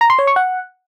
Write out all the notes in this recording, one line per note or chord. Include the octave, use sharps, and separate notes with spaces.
A#5
C6
C#5
C#6
F#5